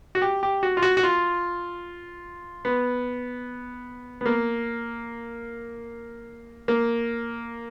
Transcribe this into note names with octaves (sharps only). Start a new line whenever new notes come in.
F#4
G4
G4
F#4
F4
F#4
F#4
F4
B3
B3
A#3
A#3